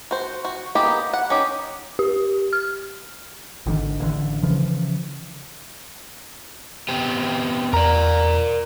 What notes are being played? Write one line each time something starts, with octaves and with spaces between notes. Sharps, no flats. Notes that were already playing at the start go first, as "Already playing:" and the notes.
F#4 C5
F#4
G#3 A#3 B3 G4 A#4
F#5
C#4 D#4 G4 D#5
G4
F6
G#1 D3 D#3
A1 D3
C#3 E3 F3
B3 C4 G4
E2 A#4 D5 A#5